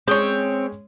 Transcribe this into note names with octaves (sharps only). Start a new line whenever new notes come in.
G#3 C4 C#4 C#5 D#6